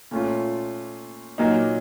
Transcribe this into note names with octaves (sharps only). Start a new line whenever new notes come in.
A#2 A3 C#4 F4
A#2 F#3 A#3 D#4